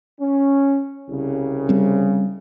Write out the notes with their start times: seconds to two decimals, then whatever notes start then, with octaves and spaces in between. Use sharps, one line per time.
0.20 C#4
1.10 C2 C#3
1.69 G3 C4